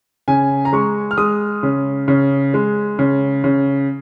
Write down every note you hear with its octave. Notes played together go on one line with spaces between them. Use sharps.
C#3 G#5
A#5
G#3 C#6
F6
G#3 D#6
C#3
C#3
G#3
C#3
C#3